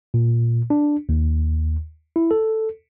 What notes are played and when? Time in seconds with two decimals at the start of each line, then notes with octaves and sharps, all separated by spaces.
0.14 A#2
0.70 D4
1.09 D#2
2.16 E4
2.31 A4